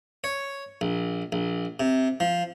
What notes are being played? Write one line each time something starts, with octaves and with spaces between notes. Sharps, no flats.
C#5
A#1
A#1
C3
F3